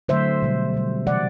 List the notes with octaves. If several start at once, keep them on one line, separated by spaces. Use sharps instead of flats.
D3 F#3 A3 C5 E5
B2 G3
B2 G3
C3 E3 G3 D5 F#5